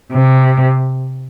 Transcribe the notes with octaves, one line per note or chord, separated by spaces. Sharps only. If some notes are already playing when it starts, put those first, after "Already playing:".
C3